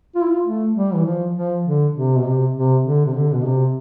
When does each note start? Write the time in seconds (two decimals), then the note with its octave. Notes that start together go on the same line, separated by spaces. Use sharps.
0.15 F4
0.22 E4
0.29 F4
0.45 A3
0.74 G3
0.94 E3
1.05 F3
1.34 F3
1.65 D3
1.95 C3
2.18 B2
2.25 C3
2.55 C3
2.85 D3
3.05 C3
3.15 D3
3.33 B2
3.44 C3